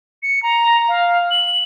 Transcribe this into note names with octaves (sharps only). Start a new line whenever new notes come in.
C#7
A#5
F5
F#7